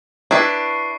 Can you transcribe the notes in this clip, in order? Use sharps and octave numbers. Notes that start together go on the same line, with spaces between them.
D4 E4 B4 C#6 C7